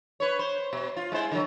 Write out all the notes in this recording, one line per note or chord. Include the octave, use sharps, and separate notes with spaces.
B4 C#5
C5
B2
F4
G#3 E4 C5
D3 F#3